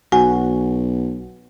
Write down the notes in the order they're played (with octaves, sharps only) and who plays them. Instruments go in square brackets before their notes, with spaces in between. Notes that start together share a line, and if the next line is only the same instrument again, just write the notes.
[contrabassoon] B1 [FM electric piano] F#4 [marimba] G#5